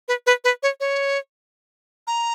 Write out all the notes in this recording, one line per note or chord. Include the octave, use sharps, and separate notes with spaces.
B4
B4
B4
C#5
C#5
A#5